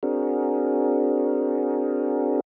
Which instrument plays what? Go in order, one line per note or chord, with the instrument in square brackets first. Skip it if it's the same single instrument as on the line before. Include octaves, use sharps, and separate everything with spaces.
[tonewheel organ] C4 D4 F#4 G#4 A#4